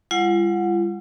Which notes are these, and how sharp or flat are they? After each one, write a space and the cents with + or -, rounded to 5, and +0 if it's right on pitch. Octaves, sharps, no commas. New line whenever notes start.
G3 +40 F4 -40 F#5 -20